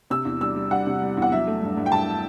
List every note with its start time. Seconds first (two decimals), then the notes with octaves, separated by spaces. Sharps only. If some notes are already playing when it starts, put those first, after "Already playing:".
0.10 C3 E6
0.25 E2
0.41 G3 E6
0.56 G3
0.71 G3 F#5
0.86 C3
1.01 G3
1.17 E2
1.22 F#5
1.32 F#3 E5
1.47 A3
1.62 G2
1.77 G2
1.86 G5
1.92 G2 A5